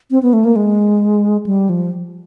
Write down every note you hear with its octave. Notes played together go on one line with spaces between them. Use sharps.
C4
B3
A3
A#3
G#3
G3
F3